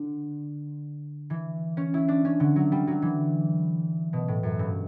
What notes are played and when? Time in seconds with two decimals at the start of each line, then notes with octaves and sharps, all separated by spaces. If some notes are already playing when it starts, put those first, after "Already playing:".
Already playing: D3
1.30 E3
1.77 C#4
1.94 E4
2.08 D4
2.25 C#4
2.40 D3
2.56 F#3
2.72 G3
2.87 F#3
3.02 E3
4.13 B2
4.28 A2
4.43 F#2
4.59 G2